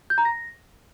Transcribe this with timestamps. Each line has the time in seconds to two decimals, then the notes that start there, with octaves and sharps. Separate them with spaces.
0.10 G6
0.18 A#5
0.25 A#6